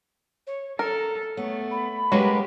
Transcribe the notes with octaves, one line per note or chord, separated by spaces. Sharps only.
C#5
A4 A#4 A#5
A3 B3 C#5
B5
F#3 G#3 A#3 F#4 G4 A#4 B4